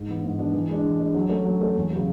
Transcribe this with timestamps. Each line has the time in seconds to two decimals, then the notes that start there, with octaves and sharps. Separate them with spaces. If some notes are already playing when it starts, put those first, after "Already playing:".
Already playing: G#2
0.08 E3 B3 D4
0.24 G#2
0.39 E3 B3 D4
0.54 E3
0.69 G#3 D4
0.84 E3
1.00 G#3 D4
1.14 F#3
1.29 A3 C#4
1.45 F#3
1.61 A3 C#4
1.76 E2
1.90 F#3
1.96 C#3